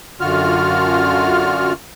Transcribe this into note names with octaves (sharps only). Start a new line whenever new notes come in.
F#2 D3 F4 F#4 F6